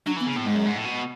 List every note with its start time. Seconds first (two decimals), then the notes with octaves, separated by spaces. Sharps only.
0.06 F#3 D4
0.16 E3 B3
0.26 C#3
0.33 B3
0.36 A2
0.45 G#2 G#3
0.55 F#2
0.66 G#2
0.75 A2
0.85 B2